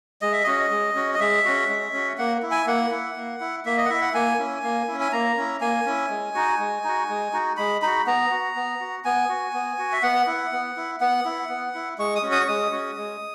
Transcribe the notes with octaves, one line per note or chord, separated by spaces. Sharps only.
G#3 D#5
E5
C#4 F#4 D#5
G#3
C#4 F#4
D#5
G#3 E5
C#4 F#4
G#3
C#4 F#4
A#3 F#5
E4
G#5
A#3 F#5
E4
A#3
E4
A#3 E5
D#5
F#5
E4 E5
F#5
A#3 G#5
C#4 E4
A#3
C#4 E4
G#5
A#3 A#5
C#4 E4
A#3 G#5
C#4 E4
G#3
D#4 F#4
G#3
D#4 F#4
G#3
D#4 F#4
G#3 B5
D#4 F#4 B5
B3 A#5
F#4
B3
F#4
B3 G#5
F#4
B3
F#4
E5
B3 F#5
E4
B3
E4
B3 F#5
E4
B3
E4
G#3 C#6
D#6
C#4 F#4
D#6
C#6
G#3 D#6
C#4 F#4
G#3